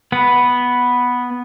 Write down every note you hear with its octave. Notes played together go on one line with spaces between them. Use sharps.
B3 B4